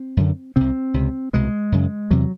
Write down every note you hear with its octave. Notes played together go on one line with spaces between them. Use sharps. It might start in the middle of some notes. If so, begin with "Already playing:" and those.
Already playing: C4
F#2 D3
C2 C3 C4
C#2 C3
C2 B2 G#3
F#2 C#3
E2 C3 F#3